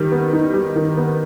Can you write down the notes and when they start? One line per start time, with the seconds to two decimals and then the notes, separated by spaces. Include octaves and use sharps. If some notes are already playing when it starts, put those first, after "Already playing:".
Already playing: D#3 G3
0.12 B3
0.33 D#4
0.54 G3
0.76 D#3
0.97 B3